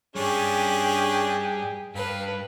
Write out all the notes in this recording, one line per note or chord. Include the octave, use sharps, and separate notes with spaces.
G2 G3 C#4 D4 G4 G#4
G2 B4 F5